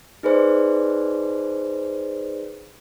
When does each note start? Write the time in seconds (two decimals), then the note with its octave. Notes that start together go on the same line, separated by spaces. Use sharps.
0.23 D#4 G#4 B4 C5 D5